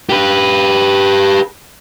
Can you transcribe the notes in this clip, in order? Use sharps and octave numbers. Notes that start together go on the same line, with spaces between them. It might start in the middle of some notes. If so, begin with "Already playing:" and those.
G4 B4